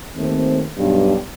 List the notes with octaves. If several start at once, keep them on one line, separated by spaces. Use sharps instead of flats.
D#2 A3 C4
B1 G2